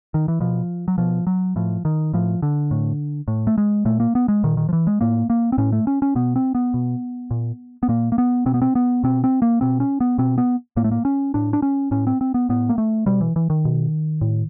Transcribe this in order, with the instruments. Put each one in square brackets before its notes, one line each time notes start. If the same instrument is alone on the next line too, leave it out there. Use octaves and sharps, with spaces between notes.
[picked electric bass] D#3
E3
B2 F3
F#3
B2 F3
F#3
A2 F3
D#3
A2 F3
D3
A2
A2
A3
G#3
A#2 A3
A#3
B3
G#3
A#2 D#3
D#3
F3
E3
G#3
A2 A#3
A#3
C4
A2 C#4
A3
C#4
C#4
B2 B3
C4
B3
B2
A#2
B3
A#2 A#3
A#3
B3
B2 C4
B3
C4
B3
B2 C4
C4
A#3
B2 C4
C#4
B3
B2 C4
B3
A2 A#3
A3
A#3
C#4
A2 D4
D4
C#4
A2 C#4
C4
C4
B3
A2 B3
A#3
A3
B2 G3
E3
E3
D#3
B2
A2